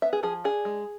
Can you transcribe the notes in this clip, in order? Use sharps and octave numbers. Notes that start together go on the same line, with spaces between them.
B3 E5
G#4
F3 G#4
D4 G#4
G#3